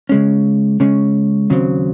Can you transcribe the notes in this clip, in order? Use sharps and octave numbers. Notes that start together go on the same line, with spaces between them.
C#3 G#3 C#4
C#3 G#3 C#4
D#2 C#3 F#3 C4